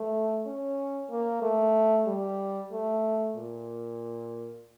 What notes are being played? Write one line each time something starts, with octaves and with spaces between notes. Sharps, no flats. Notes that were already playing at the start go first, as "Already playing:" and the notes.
Already playing: A3
C#4
A#3
A3
G3
A3
A#2